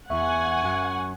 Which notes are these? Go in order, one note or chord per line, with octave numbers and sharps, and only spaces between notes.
E2 E5 F#5 G#5 C#6
F#2